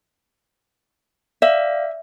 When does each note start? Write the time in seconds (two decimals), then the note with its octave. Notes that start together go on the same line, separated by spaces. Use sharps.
1.42 D5 E5 F5